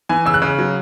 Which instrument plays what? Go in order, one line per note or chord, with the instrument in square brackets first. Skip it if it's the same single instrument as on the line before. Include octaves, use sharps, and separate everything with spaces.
[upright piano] E3 G#5
C#3 E6
F#6
C#3
F#3